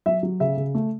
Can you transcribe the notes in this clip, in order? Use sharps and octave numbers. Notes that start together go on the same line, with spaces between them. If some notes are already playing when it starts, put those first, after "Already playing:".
F#3 E5
F#3
C#3 E5
C#3
A3